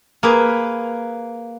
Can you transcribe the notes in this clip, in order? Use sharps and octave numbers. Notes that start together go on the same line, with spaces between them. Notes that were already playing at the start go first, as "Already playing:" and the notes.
A#3 G#4 B4